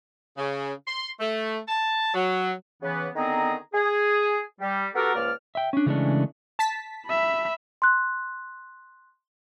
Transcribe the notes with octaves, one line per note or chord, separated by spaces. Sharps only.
C#3
C6
A3
A5
F#3
C#3 E3 B3
D3 D#3 B3 C4 G#4 A#5
G#4
G3
B3 F#4 G4 A4 A#4
C#2 F3 A#3 D5 F6
E5 G5
C#4 D4
C#3 E3 G#3 A3 C#4 D4
A5 B6
E5 B5
C6 F#6